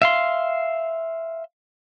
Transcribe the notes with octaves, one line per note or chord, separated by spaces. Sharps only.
E5 F5 C6